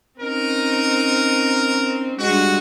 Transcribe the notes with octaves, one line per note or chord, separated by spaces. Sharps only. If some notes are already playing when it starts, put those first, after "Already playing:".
C4 C#4 D#4 A#4
G2 G#3 F#4